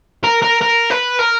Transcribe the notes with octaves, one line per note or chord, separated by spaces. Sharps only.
A#4
A#4
A#4
B4
A#4